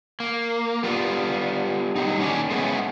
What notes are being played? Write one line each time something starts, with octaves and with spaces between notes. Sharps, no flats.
A#3
G3 B3 F4
F#3 G3 D#4
D#3 A#3 C#4 A#4 C#5 D5
G#3 A3 B3 C#4 D#4 F#4